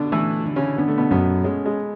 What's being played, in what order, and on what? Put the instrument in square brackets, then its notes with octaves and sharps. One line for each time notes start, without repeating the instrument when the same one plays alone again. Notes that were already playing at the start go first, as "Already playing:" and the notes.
Already playing: [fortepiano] B2 D3 D4
[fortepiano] E3 E4 [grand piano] A3
[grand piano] D3
[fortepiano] C#3 C#4
[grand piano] D3 [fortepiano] B3
[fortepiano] A3
B2 B3
[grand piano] F#2 [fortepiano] B2 B3
[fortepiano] G#3 [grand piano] C#4
[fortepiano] G#3